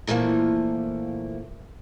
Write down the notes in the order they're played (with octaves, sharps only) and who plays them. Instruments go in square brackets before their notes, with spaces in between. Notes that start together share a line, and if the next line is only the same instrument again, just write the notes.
[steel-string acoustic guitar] A#2 E3 F3 A3 A#3